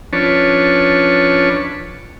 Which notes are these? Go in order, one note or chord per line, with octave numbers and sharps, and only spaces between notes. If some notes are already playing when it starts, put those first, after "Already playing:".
F3 C#4 D4 B4 C#5 A5